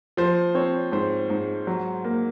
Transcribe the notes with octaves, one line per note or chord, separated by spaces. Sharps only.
F3 C5
C4 C#5
G#2 C5
G#2
F#3
A#3